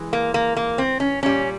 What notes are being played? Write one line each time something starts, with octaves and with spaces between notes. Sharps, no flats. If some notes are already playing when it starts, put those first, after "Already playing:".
Already playing: E3 G#3
A#3
A#3
A#3
C4
C#4
A#2 G3 C#4